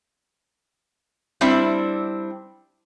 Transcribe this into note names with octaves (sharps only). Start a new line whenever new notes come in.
G3 C4 D4 E4